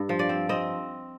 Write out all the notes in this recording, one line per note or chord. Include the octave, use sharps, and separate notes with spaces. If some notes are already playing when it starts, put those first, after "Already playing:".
Already playing: G2
F3
D5
C4
C4 D#5